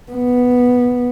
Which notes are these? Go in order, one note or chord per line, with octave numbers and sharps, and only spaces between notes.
B3